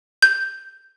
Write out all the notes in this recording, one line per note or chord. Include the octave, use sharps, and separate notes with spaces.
G6